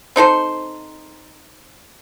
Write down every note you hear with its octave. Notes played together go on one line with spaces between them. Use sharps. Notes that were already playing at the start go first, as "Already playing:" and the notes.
C4 D#4 A4 C5